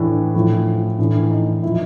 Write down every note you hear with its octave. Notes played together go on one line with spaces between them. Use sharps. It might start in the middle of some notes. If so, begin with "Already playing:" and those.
Already playing: A2 E3 D4
A2 F3
A2 E3 D4
D#4
A#2 F3 E4